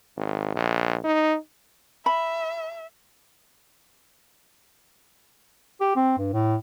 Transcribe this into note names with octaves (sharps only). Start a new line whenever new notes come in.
G#1
A#1
D#4
E5 B5
G4
C4
G2
A2